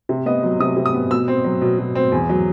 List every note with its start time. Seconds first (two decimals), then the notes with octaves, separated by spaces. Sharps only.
0.09 C3
0.26 B3 D#5
0.43 F#3
0.60 C3 D#6
0.76 C3
0.86 D#6
0.94 B3
1.11 B2 E6
1.28 C4
1.44 F#3
1.61 B2
1.79 B2
1.95 C4
2.12 E2
2.29 F#3